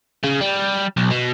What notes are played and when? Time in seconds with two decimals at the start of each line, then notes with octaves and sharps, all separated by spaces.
0.23 C#3
0.41 G3
0.97 B1
1.11 B2